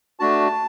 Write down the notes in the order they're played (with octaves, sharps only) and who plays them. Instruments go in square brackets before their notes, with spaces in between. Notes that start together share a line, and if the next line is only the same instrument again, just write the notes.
[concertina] A3 D4 F#4 A5